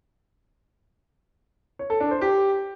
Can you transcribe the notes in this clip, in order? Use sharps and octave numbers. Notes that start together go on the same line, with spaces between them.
C#5
A4
D4
C5
G4